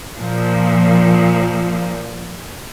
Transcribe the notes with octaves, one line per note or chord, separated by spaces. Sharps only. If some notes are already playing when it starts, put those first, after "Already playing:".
A#2 F3